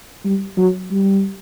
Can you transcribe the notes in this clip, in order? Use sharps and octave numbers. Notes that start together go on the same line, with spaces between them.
G3
F#3
G3